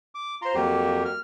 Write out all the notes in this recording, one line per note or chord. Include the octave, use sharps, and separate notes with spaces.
D6
F4 C5 A#5 C6
F2 F#3 A#3 G4
F6